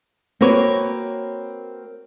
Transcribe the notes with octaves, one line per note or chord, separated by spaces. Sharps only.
A#3 C4 F#4 B4 C#5